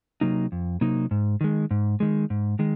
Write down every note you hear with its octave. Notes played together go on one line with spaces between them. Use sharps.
C3 F#3 A#3 D#4
F2
C3 F#3 A#3 D#4
G#2
D#3 G#3
G#2
D#3 G#3
G#2
D#3 G#3